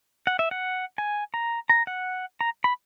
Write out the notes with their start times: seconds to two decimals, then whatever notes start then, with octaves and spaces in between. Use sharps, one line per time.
0.27 F#5
0.39 E5
0.51 F#5
0.98 G#5
1.34 A#5
1.69 A#5
1.87 F#5
2.41 A#5
2.64 B5